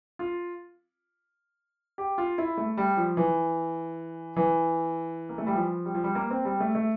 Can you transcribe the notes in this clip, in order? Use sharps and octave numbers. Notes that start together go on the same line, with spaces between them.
F4
G4
F4
E4
A3
G3
F3
E3
E3
A#3
A3
G3
F3
G3
F3
G3
A#3
C4
G3
A3
A3